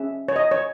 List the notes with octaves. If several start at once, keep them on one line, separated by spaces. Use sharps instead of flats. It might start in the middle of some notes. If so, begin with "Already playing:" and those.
Already playing: C#4 G#4 E5
C#5
D#5
C#5